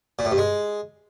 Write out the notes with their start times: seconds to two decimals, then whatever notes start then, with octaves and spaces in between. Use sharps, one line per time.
0.19 A#2
0.25 A2
0.31 G2
0.38 G#3